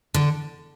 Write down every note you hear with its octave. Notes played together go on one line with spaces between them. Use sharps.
D3